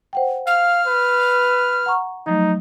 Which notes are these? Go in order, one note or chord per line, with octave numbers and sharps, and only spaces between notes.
C5 F#5 G5
F5 F6
B4
F#5 A#5 C#6
F3 F#3 A3 D#4